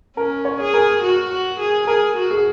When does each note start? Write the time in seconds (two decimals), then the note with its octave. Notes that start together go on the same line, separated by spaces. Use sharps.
0.17 C#4 A#4
0.45 C#5
0.60 G#4
0.74 A#4
1.03 F#4
1.31 F#4
1.59 G#4
1.87 G#4 A#4
2.16 F#4
2.31 G#4